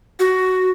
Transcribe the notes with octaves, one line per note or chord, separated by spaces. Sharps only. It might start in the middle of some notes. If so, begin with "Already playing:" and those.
F#4